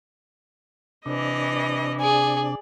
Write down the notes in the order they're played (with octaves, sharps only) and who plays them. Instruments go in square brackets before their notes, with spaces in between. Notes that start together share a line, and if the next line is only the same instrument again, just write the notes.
[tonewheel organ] C3 D4 [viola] E3 D#5
[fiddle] G#4 [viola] D5